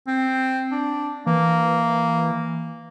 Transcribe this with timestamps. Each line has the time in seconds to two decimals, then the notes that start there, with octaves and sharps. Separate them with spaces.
0.07 C4
0.71 D4
1.26 E3 A#3